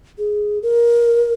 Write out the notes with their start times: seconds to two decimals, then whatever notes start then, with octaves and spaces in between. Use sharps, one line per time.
0.18 G#4
0.63 A#4